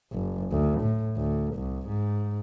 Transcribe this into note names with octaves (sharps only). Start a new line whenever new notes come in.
F#1
D2
A2
D2
C2
G#2